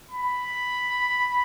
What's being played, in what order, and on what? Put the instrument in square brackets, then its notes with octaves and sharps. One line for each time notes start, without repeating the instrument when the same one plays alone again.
[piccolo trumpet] B5